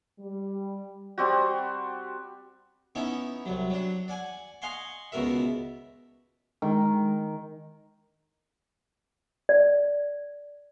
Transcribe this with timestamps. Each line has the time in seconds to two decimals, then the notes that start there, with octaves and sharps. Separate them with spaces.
0.19 G3
1.18 G3 C4 F#4
2.95 B3 C#4 D#4 E4
3.46 C2 F#3
3.70 F#3 D4
4.08 D5 F#5 G#5
4.62 D#5 F5 F#5 G#5 C6 C#6
5.12 C#2 B2 F#4 A#4 E5
6.62 D#3 G#3
9.49 D5